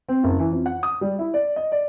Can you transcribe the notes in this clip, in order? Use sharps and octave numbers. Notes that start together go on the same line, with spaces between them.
C4
F#1
E3
F2
F#5
D#6
G3
E4
D5
D#5
D5